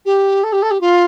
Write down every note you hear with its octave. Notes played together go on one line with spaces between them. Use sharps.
G4
A4
G4
A4
G4
F4